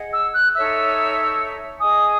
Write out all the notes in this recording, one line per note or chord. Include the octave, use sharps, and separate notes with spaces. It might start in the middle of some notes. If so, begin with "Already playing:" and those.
Already playing: G#4 D#5 F#5
E6
F#6
D#4 A4 C#5 E5 E6
G#4 D#5 G#5 D#6